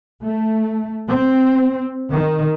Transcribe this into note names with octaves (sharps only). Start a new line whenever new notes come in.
A3
C4
D#3